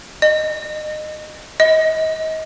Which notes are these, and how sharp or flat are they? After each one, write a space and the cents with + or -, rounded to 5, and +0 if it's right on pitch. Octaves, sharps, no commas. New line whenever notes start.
D#5 -25
D#5 +30